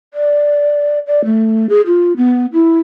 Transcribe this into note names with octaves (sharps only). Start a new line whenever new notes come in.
D5
D5
A3
G#4
F4
B3
E4